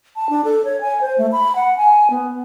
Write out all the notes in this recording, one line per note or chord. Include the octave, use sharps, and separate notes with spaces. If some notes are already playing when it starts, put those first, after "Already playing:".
A5
D4
A4
C#5
G#5
C5
A3
B5
F#5
G#5
B3